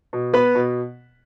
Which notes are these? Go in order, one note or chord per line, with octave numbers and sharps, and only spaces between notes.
B2
B3 B4 B5
B2